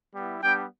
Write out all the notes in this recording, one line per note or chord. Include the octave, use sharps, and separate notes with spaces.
G3 B3 E4
G3 B3 D4 G5